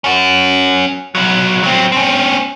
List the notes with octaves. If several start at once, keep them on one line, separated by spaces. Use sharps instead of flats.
C#4 F#4
B1 F#3
F#3 C4
C4 C#4